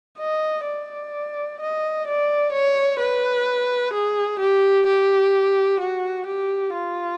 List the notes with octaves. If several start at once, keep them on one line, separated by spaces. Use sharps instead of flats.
D#5
D5
D#5
D5
C#5
B4
G#4
G4
G4
F#4
G4
F4